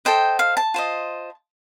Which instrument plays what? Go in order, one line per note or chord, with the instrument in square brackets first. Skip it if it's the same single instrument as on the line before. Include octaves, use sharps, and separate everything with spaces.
[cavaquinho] A4 C5 D#5 G5
F5
A5
F4 C5 D#5